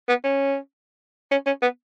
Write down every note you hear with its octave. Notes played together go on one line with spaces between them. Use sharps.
B3
C#4
C#4
C#4
B3